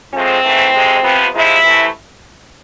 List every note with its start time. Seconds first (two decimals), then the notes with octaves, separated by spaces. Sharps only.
0.13 A2 F3 G#3 C4
0.44 G#2 E3 A3
0.73 F2 C3 G#3
1.03 C3 F3 B3
1.34 C3 F3 G#3 E4
1.64 C3 E3 A3